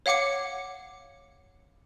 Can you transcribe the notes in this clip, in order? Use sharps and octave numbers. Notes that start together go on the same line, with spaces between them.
C#5 F5 F#5 D6 C#7